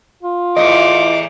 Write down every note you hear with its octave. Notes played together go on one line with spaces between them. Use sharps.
F4
E2 A2 E3 D#5 D6